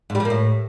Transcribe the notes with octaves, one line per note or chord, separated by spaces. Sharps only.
G#2
G3
F3
A#3
A2